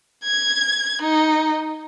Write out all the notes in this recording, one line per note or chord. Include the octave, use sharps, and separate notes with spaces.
G#6
D#4